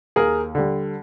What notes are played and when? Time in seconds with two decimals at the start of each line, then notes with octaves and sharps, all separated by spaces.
0.16 D#2 G#4 A#4
0.55 D3 G3